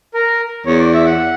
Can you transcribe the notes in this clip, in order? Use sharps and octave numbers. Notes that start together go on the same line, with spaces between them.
A#4
E2 C#5
D5
E5
F#5